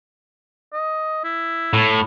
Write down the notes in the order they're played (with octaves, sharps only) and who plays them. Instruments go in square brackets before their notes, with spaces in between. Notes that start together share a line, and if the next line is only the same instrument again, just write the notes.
[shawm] D#5
E4
[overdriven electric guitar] A2